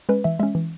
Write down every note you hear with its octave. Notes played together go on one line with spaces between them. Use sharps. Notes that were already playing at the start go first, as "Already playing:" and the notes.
G#3 C#4 B4
E3 E5
G#3 C#4 E5
E3